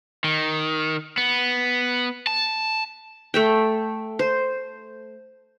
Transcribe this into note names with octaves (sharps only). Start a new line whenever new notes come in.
D#3
B3
A5
A3 E5 G5
C5